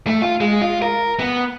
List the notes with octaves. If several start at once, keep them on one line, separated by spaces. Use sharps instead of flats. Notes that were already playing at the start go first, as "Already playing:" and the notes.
A3
F4
G#3
F4
A#4
B3